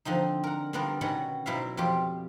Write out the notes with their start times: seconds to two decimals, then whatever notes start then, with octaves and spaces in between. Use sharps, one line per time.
0.05 D3 F3 C4 D#4
0.44 A#4 F#5
0.73 D3 G3 B3 D4 F4 A#4
1.01 B2 D#3 C#4 F#4 B4 F#5
1.46 B2 F#3 E4 C5 E5 F5
1.77 F2 B2 F4 G4